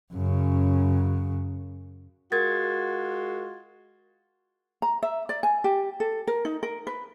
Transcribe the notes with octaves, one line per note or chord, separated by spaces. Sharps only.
F#2 C#3
G#3 F4 F#4 A#4 G#6 A6
A#5
E5
D5
G#5
G4
A4
A#4
D#4
A#4
B4